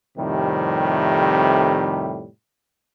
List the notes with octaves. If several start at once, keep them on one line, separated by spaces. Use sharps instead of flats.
F2 A2 C3 D#3 G3